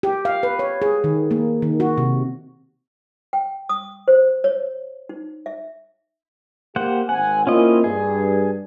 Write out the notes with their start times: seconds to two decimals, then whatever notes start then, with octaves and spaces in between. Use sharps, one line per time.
0.03 G4
0.25 F5
0.43 B4
0.59 C#5
0.82 G#4
1.04 D#3
1.31 A#3
1.62 D#3
1.80 F#4
1.98 C3
3.33 G5
3.69 D#6
4.08 C5
4.44 C#5
5.09 D#4
5.46 E5
6.76 A#3 G4 C5 F#5
7.09 G#1 C4 F#5 G#5
7.47 A#3 C4 C#4 E4 F4 D#5
7.84 G2 G#4